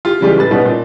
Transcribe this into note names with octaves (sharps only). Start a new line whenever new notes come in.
F4 G4
C#3 E3 G3 G#3 F4 G4
A2 B4 A6
B2 G3 B3 C#4 D#4
A#2